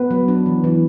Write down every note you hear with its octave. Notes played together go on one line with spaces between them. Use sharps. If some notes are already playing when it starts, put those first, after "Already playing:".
Already playing: B3 B4
F#3
D4
E3
E3